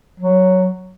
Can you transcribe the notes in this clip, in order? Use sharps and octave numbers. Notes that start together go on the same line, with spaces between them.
F#3